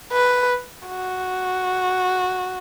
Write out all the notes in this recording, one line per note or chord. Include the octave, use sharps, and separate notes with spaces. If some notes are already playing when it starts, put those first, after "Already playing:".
B4
F#4